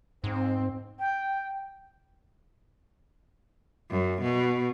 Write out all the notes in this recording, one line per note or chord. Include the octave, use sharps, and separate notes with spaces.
G#2 C4
G5
F#2
B2